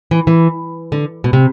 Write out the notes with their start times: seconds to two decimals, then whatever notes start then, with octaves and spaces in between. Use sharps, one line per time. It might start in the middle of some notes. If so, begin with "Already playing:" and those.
0.11 E3
0.27 E3
0.92 D3
1.24 B2
1.33 C3